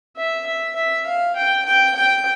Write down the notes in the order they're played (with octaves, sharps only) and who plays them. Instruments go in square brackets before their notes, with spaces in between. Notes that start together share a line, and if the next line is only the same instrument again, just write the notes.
[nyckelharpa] E5
E5
E5
F5
G5
G5
G5